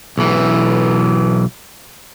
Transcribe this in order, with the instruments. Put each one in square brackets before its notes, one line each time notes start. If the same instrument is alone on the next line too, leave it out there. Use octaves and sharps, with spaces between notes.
[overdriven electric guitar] B1 E3